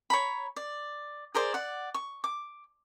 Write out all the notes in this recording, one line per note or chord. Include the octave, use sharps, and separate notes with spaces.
C#5 A#5 B5
D5
G#4 A#4 C5 D5
D5 F#5
C#6
D6